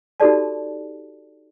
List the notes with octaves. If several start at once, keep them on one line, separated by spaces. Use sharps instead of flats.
D#4 F#4 G4 A4 D5 A5